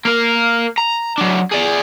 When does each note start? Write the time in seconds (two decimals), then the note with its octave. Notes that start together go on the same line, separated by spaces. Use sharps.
0.05 A#3 A#4
0.78 A#5
1.18 F#3 D4
1.51 G#4 D5